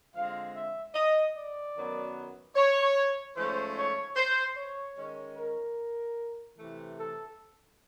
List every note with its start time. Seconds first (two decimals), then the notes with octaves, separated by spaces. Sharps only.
0.15 D3 F3 G#3 C4 F5
0.54 E5
0.95 D#5
1.35 D5
1.76 F#2 D#3 F#3 B3
2.56 C#5
3.36 G#2 F3 A3 C#4 C5
3.77 C#5
4.16 C5
4.56 C#5
4.97 D#3 G#3 C#4
5.36 A#4
6.57 C3 E3 A3
6.98 A4